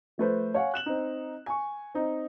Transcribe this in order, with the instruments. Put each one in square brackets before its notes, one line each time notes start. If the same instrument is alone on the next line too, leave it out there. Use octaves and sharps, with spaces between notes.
[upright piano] F3 A3 B4 C5
C#5 F5 F#5 G#5
F#6 E7 F#7
C4 D#4
G#5 C#6
C4 D#4